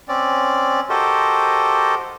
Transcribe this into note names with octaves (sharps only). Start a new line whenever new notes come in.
C4 C#4 D5
F#4 G4 A4 A#4 C5 D#5